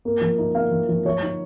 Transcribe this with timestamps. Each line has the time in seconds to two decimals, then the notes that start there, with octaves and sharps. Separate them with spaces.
0.05 A#3
0.21 F3
0.38 D#4
0.55 A#3 F5
0.71 F3
0.89 F3
1.05 F3 C#5
1.22 D#4